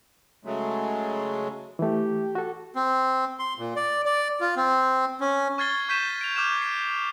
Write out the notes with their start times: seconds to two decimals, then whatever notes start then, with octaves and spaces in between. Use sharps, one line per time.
0.45 C#3 F#3 G#3 A3
1.79 E3 A3 G4
2.35 F#4 A4
2.76 C4
3.39 C6
3.58 A#2
3.76 D5
4.05 D5
4.41 F4
4.56 C4
5.21 C#4
5.58 C#6 F6 G#6 A6 C7 G7
5.89 C#6 G6 B6 D#7 E7
6.21 D7 F7
6.36 D6 F6 G6 E7
6.62 C7